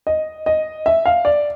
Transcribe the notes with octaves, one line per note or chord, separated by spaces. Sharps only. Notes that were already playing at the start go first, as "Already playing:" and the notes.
D#5
D#5
E5
F5
D5